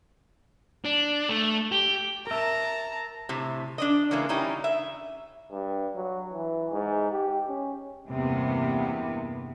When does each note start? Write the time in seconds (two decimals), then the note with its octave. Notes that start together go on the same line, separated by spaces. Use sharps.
0.85 D4
1.29 A3
1.72 G4
2.27 A#4 E5 A5 A#5
3.29 A2 C3
3.78 D4 D5 D#5
4.11 C#3 E3 G#3 A#3
4.29 G3 C#4 D#4 E4
4.64 E5
5.51 G2
5.96 F#3
6.33 E3
6.71 G#2
7.12 G4
7.49 C#4
8.09 E2 G2 C3 A#3 B3